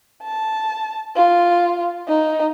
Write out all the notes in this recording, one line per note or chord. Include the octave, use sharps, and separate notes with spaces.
A5
F4
D#4